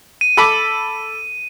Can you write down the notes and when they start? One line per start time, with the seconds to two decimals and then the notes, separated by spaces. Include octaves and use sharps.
0.21 D#7
0.37 A4 B5 D6